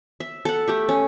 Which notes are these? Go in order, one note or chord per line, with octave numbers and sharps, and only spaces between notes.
E5
A4 F#5
A3 G4 E5
C#4